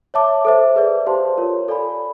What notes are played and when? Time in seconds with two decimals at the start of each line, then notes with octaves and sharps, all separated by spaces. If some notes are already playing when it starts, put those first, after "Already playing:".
0.14 C#5 E5 A5 D6
0.45 A4 C5 E5
0.76 G#4 B4 D5
1.07 G4 C5 F5 A5 C6
1.38 F4 A#4 C#5
1.68 A4 D5 F5 G#5 B5